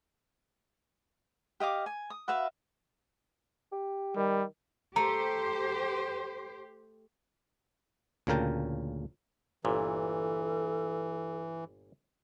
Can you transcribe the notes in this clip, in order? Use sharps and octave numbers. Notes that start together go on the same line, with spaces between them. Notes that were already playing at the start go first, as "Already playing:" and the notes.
G4 D#5 F5 D6
G#5
D#6
F#4 B4 E5 F5
G4
D#3 G3
A3 G4 C5 A#5
D2 A#2 C#3 A#4 G5 A5
G1 A#2 E3 A4